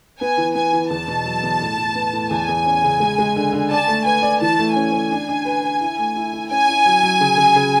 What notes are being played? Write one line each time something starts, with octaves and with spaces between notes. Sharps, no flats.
B3 G#5
E3
B3 G#5
E3
E2 A5
B2
F#3
E2
A2
A2
B3
A2
E2 G#5
E2
C#4
C#3
G#3
G#3
D3
D3
D5 A5
A3
B4 G#5
D5
E3 A5
A3
C#4 G#5
C#4
D4
D4
B4
B4
E4
A3
E4
E4
C#4 G#5
E4
F#3
F#3
C#3
C#3
C#3